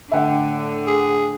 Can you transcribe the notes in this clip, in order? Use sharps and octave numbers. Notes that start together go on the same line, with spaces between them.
A2 D3 E5 F#5 G5
G#4